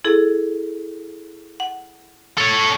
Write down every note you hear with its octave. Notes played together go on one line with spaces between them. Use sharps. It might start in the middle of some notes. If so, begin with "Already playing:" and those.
E4 G#4 A4
F#5
A4 C#5